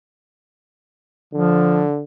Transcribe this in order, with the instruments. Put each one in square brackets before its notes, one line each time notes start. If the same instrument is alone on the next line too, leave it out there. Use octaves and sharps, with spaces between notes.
[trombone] D3 [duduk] F3